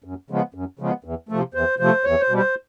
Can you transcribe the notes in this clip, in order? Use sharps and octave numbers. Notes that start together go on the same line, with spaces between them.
F#2
C#3 F3 G#3 B3
F#2
C#3 F3 G#3 B3
E2
C3 F3 A3
E2 C5
C3 F3 A3 C5
E2 C#5
C5
B2 G3
C5